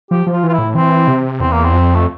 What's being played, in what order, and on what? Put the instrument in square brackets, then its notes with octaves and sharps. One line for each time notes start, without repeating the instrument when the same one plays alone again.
[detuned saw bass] F3 [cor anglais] G4
[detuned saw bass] F3
[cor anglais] F4
[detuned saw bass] E3
[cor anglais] F4
[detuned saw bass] A2 [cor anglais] E4
[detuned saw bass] E3 [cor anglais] C4
[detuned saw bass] C3
[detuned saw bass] E2 [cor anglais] C4
[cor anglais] A#3
C4
[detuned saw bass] F2
[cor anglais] A3